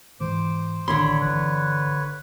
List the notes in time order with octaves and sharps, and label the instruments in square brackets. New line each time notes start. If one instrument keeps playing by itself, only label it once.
[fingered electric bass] G#2 E3 [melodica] C5 D6
[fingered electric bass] A1 D#3 [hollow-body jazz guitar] D3 C6 [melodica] C#5 B5
[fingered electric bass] G1 E3 [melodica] B4 C#5